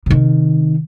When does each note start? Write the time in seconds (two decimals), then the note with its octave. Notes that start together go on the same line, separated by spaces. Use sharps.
0.06 C3 D#3